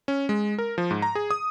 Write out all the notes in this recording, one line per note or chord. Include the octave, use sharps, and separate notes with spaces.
C#4
G#3
A#4
F3
G#2
A#5
G#4
D#6